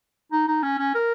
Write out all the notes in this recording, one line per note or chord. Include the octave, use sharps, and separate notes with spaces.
D#4
D#4
C#4
C#4
A#4